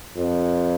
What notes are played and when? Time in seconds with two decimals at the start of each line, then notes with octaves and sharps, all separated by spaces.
0.17 F2